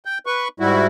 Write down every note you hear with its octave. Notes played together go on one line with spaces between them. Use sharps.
G5
B4 C#6
G#2 G3 E4 F#4